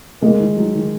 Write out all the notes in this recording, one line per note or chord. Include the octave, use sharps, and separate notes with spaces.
G#3 A#3
D#3
F#3
D#3